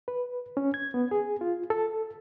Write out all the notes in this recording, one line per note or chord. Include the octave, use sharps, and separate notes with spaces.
B4
C#4
G#6
B3
G#4
F4
A4